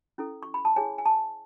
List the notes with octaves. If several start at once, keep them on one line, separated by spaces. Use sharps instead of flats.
C#4 E4 A4
C#6
B5
A5
E4 G#4 C#5 G#5
G#5
A5